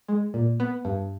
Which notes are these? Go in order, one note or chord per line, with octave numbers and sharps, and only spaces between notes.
G#3
A#2
B3
G2